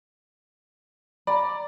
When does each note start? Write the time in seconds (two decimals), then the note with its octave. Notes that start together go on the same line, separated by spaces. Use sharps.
1.27 D5 A#5 B5